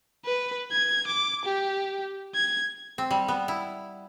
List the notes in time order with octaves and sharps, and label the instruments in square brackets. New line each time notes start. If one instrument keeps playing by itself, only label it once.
[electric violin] B4
G#6
D6
G4
G#6
[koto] C4
G3
B3
E4